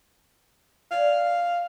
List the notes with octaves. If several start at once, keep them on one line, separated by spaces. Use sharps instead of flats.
D4 D5 F5 G#5